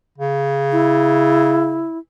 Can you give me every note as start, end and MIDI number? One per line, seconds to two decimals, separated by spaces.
0.18 1.88 49
0.72 1.98 64